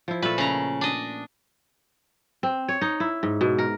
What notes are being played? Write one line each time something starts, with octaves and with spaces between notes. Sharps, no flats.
F3 E4
A#2 A3 A4 B4
C#3 A#5
D4 D#5
C4
C#5
D#4
E4
G#2
B2
A#4